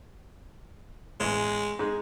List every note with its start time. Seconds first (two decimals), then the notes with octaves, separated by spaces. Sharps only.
1.20 A1 E2 G#3
1.79 G#2 G#3